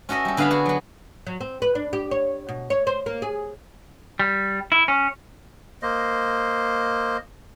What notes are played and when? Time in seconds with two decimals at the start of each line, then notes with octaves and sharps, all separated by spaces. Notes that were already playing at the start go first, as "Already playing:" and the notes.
0.09 C#4 F#4 A4 D#5 E5
0.25 G3 A4
0.37 D3 B3 G#4 F5 A5 B5
0.51 F#4 G#4
0.66 F#3 B3
1.27 F#3
1.41 C4
1.62 B4
1.75 D4
1.93 G4
2.11 C#5
2.49 B2
2.70 C#5
2.87 C5
3.06 A#3
3.22 G#4
4.20 G3
4.72 E4
4.88 C#4
5.82 A#3 C5 D#5